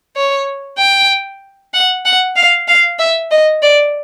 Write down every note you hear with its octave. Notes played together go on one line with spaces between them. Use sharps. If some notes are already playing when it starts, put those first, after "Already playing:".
C#5
G5
F#5
F#5
F5
F5
E5
D#5
D5